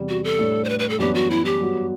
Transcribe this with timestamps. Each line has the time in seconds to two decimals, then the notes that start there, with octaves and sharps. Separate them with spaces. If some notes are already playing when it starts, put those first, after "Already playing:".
Already playing: E2 C3 G3
0.09 F#4
0.24 A4
0.39 A2 G3 D4
0.64 C5
0.69 B4
0.79 B4
0.89 A4
0.99 F#2 E3 G3 B3 D4 G4
1.14 F#4
1.30 E4
1.45 G4
1.60 G2 F#3 B3 F#4